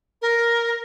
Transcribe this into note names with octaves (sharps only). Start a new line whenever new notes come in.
A#4